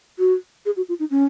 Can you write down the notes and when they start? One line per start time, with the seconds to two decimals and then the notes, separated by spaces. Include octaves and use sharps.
0.19 F#4
0.66 G#4
0.77 F#4
0.89 F4
1.00 D#4
1.11 C#4